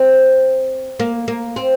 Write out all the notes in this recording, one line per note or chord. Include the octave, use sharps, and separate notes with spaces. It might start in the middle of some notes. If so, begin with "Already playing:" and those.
Already playing: C4
A#3
A#3
C4